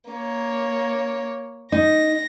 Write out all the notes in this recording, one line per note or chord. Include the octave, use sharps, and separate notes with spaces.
A#3 C#5
D#4 A#6